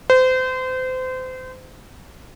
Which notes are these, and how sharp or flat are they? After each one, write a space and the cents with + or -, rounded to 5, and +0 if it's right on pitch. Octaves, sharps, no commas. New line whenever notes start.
C5 -30